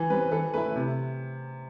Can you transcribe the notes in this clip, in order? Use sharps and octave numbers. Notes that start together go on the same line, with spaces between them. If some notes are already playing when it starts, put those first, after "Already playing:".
Already playing: E3
G3 C4 B4
E3 A4
A3 E4 B4
C3